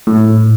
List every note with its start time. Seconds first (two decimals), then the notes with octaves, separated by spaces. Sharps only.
0.07 A2